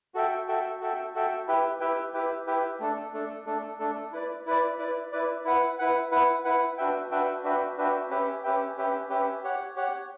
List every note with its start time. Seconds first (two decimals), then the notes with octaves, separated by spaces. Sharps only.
0.15 F#4 A4 E5 G5
0.48 F#4 A4 E5 G5
0.81 F#4 A4 E5 G5
1.14 F#4 A4 E5 G5
1.48 E4 G4 B4 E5 G5
1.80 E4 G4 B4 E5 G5
2.14 E4 G4 B4 E5 G5
2.47 E4 G4 B4 E5 G5
2.80 A3 D4 A4
3.13 A3 D4 A4
3.46 A3 D4 A4
3.79 A3 D4 A4
4.12 E4 B4 D5
4.46 E4 B4 D5
4.79 E4 B4 D5
5.12 E4 B4 D5
5.45 E4 B4 F#5
5.79 E4 B4 F#5
6.11 E4 B4 F#5
6.45 E4 B4 F#5
6.78 D4 F#4 B4 E5 G5
7.11 D4 F#4 B4 E5 G5
7.44 D4 F#4 B4 E5 G5
7.78 D4 F#4 B4 E5 G5
8.10 C#4 G4 B4 E5 G5
8.44 C#4 G4 B4 E5 G5
8.77 C#4 G4 B4 E5 G5
9.09 C#4 G4 B4 E5 G5
9.44 G4 C#5 F#5
9.76 G4 C#5 F#5